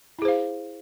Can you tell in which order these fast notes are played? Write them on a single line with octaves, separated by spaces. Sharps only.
E4 G#4 C5 F5